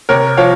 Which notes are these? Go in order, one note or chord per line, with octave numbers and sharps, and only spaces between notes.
C3 A#4 C#5
F3 C#5 F5